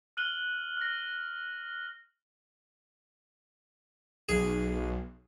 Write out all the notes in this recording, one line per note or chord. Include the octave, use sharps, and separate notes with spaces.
F6 F#6 D#7 F#7 G7
F6 A#6
B1 G#4